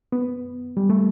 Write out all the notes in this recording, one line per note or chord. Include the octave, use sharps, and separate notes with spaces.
B3
G3
A3